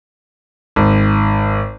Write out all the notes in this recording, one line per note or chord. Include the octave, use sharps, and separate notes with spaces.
G#1